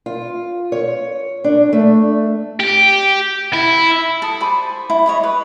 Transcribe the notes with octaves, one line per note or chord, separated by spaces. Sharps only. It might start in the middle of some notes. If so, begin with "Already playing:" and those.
F4
C#5
D4
A3
G4
E4
A4 D#6
C5 D5 G#5 B5
E4
C#5 D#5 B5
B4